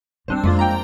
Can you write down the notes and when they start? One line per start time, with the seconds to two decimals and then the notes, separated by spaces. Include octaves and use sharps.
0.28 F#2 G3 C4 D4 C5
0.44 F2 G#3 A#3 F4
0.59 G5 A#5